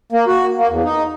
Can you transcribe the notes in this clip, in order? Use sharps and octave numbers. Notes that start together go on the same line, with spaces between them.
A#3
F#4
A#3
E2
D#4